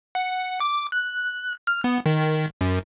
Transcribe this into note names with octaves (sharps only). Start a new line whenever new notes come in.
F#5
D6
F#6
F6
B3
D#3
F#2